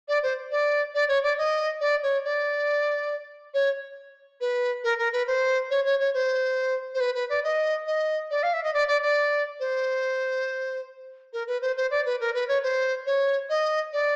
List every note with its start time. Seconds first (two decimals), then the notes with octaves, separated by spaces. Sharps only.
0.08 D5
0.23 C5
0.51 D5
0.94 D5
1.08 C#5
1.23 D5
1.37 D#5
1.80 D5
2.03 C#5
2.24 D5
3.54 C#5
4.40 B4
4.83 A#4
4.98 A#4
5.12 B4
5.27 C5
5.70 C#5
5.85 C#5
5.99 C#5
6.14 C5
6.94 C5
7.00 B4
7.14 B4
7.29 D5
7.43 D#5
7.86 D#5
8.30 D5
8.43 F5
8.53 E5
8.63 D#5
8.73 D5
8.87 D5
9.02 D5
9.59 C5
11.33 A#4
11.47 B4
11.61 C5
11.76 C5
11.90 D5
12.05 B4
12.20 A#4
12.34 B4
12.48 C#5
12.63 C5
13.06 C#5
13.49 D#5
13.92 D5